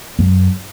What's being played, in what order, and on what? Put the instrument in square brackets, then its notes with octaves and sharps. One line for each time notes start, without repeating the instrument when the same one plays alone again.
[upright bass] F#2